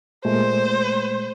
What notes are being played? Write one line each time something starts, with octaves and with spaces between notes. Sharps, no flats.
A#2 G#3 A3 C5